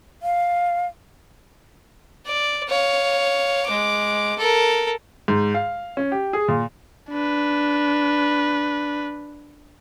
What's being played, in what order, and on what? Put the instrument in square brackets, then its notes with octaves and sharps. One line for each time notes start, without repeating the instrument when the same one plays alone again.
[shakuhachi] F5
[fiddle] D5
C#5 F5
G#3 D6
A4 A#4
[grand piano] G#2
F5
C#4
G4
G#4
A#2
[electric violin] D4 B4